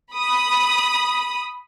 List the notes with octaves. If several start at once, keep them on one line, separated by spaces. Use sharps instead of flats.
B5 D#6